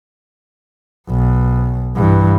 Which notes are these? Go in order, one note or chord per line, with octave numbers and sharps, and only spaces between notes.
B1
G2 E3